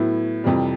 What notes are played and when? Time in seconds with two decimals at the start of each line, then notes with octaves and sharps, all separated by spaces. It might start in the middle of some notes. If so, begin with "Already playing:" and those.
Already playing: A2 F#3 B3 E4
0.44 F2 C3 E3 G3